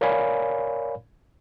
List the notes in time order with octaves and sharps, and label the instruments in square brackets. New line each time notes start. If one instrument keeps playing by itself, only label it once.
[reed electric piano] A#4 C#5 D5 F5 G#5 B5